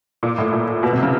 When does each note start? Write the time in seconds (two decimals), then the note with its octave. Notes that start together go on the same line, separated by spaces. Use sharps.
0.23 A#2
0.38 A2
0.53 A#2
0.83 B2
0.93 C3
1.03 C#3